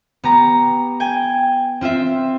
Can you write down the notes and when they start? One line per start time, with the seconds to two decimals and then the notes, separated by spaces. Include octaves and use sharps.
0.24 B3 G4 A#5
1.00 G5 G#5
1.81 C4 F4 C5 E5